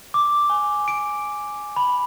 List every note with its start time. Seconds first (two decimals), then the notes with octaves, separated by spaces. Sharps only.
0.14 D6
0.50 G#5
0.88 D7
1.76 B5